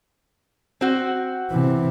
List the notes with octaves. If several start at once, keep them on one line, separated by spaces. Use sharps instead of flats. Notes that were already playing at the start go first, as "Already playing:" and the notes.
C4 F#4
C3 E3